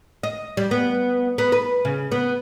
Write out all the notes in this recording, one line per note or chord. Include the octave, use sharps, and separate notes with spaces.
D#5
G3
B3
B3
B4
C#3
B3